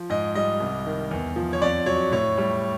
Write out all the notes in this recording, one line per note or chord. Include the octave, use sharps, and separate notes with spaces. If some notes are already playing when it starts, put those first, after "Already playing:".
Already playing: F3
G#2 D#5
G3 D#5
C2
D#3
E2
F3
C#5
F2 D5
F#3 C#5
A2 C#5
G3